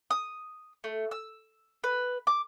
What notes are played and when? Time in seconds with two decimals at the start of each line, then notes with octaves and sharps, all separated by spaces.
0.11 D#6
0.84 A3
1.11 E6
1.84 B4
2.27 D6